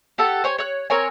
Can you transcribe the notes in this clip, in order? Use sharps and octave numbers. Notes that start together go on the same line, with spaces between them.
G4 A4 F#5 A5
C5 C#5 G#5
C#5 F#6
C4 A#4 C#5 G#5